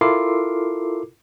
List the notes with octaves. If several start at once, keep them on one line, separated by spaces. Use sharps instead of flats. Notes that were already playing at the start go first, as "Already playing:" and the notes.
E4 F4 A4 A#4 D6 C7